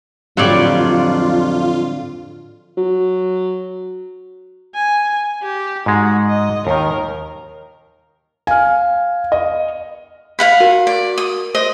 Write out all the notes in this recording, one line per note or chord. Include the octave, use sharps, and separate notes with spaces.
F2 A2 D3 F#3 G3 F4 D5
F#3
G#5
G4
G#2 G#3 F#4
D#5
D#2 D#3 A#4
F5 G#5 F6
D#5
F5 F#5 B5
F#4 A#4
D5
D#6
C5 D#5